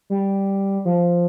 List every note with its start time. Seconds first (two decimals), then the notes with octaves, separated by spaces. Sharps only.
0.10 G3
0.85 F3